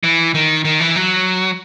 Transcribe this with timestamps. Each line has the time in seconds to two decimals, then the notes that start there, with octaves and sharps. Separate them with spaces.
0.03 E3
0.34 D#3
0.65 D#3
0.80 E3
0.96 F#3